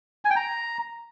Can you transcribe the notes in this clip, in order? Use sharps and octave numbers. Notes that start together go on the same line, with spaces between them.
G#5
G5
A#5